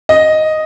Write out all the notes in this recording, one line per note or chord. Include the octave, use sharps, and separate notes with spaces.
D#5